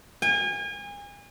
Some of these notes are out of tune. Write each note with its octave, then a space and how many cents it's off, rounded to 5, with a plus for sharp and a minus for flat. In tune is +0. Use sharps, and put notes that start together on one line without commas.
G#5 -35